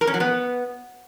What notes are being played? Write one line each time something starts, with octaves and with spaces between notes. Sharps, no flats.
A#4
C#4
F#3
B3